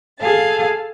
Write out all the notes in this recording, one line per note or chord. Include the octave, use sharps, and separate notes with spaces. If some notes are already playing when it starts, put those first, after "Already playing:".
G#4 A4 F5 A5